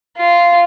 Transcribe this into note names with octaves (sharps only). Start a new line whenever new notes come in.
F4